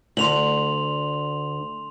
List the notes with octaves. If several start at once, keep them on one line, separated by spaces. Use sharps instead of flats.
D2 C6 F7 F#7